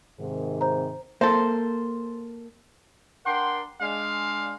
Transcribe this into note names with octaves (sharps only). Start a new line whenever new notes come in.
G#2 C3 D#3
C5 A#5
A#3 A4 C5
D4 A#4 F#5 G5 C6
G#3 D4 F5